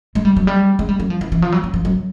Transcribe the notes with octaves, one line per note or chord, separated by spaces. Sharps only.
G#3
G3
F#3
G3
G#3
G3
F#3
F3
E3
E3
F3
F#3
F3
F3
F#3